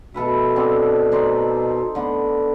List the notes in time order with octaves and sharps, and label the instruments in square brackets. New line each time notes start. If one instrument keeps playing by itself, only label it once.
[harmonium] B2 [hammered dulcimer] A4 B4 E5
[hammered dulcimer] D3 C4 D4
D#4 C5 D5
D3 B3